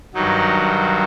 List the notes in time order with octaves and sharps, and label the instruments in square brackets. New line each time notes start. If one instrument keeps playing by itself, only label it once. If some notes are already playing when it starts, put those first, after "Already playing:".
[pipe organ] G2 D#3 F#3 D#4